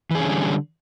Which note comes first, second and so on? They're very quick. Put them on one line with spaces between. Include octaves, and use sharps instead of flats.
E3 G#4 C#4 D3 G3